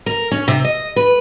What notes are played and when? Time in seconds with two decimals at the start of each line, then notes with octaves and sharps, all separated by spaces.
0.06 A#4
0.31 C#4
0.48 C3
0.65 D#5
0.96 B4